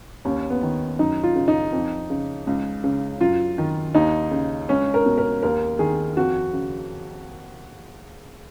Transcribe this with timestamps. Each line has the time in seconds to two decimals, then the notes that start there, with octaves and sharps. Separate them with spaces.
0.25 D#2 C#4
0.50 B3
0.63 D#3
0.99 F#2 D#4
1.23 F4
1.36 C#3
1.48 D#4
1.73 F2
2.10 C#3
2.47 C#2
2.84 C#3
3.21 F#2 F4
3.58 D#3
3.95 D#2 D#4
4.31 C#3
4.69 C#2 C#4
4.94 A#4
5.06 B2
5.18 A#4
5.43 D#2 A#4
5.79 D#3 G#4
6.17 F2 F#4
6.53 C#3